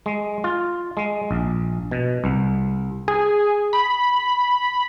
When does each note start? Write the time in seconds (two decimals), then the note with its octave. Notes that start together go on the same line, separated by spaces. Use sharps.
0.06 G#3
0.44 F4
0.97 G#3
1.31 A#1
1.91 B2
2.24 C2
3.08 G#4
3.73 B5